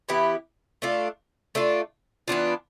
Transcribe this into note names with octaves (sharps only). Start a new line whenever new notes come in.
E3 B3 E4 G4
A3 D4 F4
A3 D4 F4
E3 B3 D4 F4